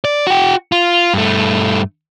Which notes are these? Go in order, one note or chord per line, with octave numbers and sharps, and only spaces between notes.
D5
F#4 G5
F4
G2 A3